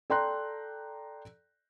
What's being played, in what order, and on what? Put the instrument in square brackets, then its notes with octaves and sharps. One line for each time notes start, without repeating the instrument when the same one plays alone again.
[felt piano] A4 D5 G5 A#5 C6 F#6